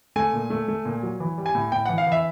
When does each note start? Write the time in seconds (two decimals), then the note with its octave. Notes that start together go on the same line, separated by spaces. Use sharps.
0.16 A3 G#5
0.33 A#2
0.50 A3
0.68 A3
0.85 A#2
1.03 F#3
1.20 E3
1.38 G3
1.46 G#5
1.55 A2
1.72 A2 G5
1.86 E3 F#5
1.98 F5
2.07 E3 E5